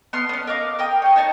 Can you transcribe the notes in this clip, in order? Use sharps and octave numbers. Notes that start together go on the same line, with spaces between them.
B3 C6 F6
B3 C#4
A#4 D#5 F5 D6
A#4 G5 D#6
C#5 D#5
D#4 C#5 A5 A#5